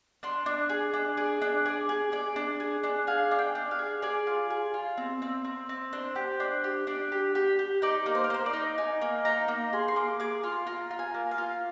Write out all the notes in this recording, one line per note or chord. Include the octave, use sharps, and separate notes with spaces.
D4 C6
D4
G#4
D4
G#4 D5
D4
G#4 D5
G#4
G#4 D5
D4
G#4
D4
G#4 F5
D4
G5
D4
F5
G#4
G#4 D5
F4
G#4
F4
C4
C4
C4
C4
D4 C5
G4
D4
G4
D4 D5
G4
G4
G4
D#4 D5
A#3
C5
A#4
A#3 C5
D5
D#4
D#4 G#5
A#3
D#4 A#5
A#3
G#4 C6
C6
A#3 D6
G#4 D6
F4 C6
F4 A#5
F4
G#5
A#3
F5
F4